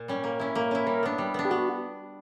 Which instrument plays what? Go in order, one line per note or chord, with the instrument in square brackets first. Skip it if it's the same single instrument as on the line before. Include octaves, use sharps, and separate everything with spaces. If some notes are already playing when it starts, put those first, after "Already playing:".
Already playing: [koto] A#2
G3 C#4
A#3
C#4 E4
A#3
C#4 E4
[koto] G3 [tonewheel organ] A#4
[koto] B3 D4
G3
B3 D4
[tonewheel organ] G4
[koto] B3 [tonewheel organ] F#4